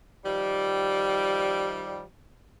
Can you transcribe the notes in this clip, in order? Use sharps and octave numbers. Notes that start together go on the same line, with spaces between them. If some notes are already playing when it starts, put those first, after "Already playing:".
D#3 F3 G3